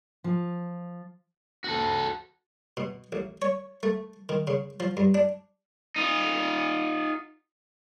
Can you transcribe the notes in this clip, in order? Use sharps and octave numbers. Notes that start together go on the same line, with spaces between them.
F3
F#4 A4
B2
A1
C#5
A3
D#3
C#3
F3
G2
D4
D#4 F4